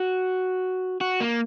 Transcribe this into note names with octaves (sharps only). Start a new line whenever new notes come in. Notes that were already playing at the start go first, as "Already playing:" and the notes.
Already playing: F#4
F#4
A#3